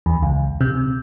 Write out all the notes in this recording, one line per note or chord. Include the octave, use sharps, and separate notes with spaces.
E2
C#2
C3